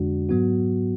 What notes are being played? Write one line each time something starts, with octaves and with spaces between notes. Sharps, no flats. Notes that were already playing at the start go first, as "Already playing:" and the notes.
Already playing: F2 D3 G#3 D4 F#4
G#2 F#3 B3 F#4